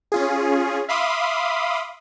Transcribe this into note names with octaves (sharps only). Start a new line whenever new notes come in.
C#4 F4 G#4
E5 F5 B5 C6 D6 D#6